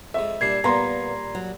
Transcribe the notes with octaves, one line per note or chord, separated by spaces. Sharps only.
F2 G#3 E5
A#2 G3 D4 G#6 C7
A#2 G3 A#3 B3 A#5 C6
F#3